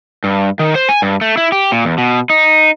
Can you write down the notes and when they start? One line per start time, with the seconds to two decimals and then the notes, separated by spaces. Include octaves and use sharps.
0.24 G2
0.59 D#3
0.75 C5
0.89 G#5
1.02 G2
1.21 A3
1.37 E4
1.52 G4
1.72 A#2
1.85 E2
1.98 B2
2.30 D#4